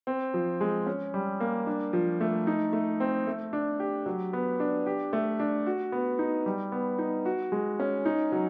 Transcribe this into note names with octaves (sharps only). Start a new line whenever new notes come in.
C4
F3
G#3
C#4
G3
A#3
D4
F3
A3
D#4
A3
C4
A3
D4
G4
F#3
B3
D4
G4
A3
D4
F#4
B3
D#4
G3
B3
D#4
F#4
G#3
C#4
D#4
F#3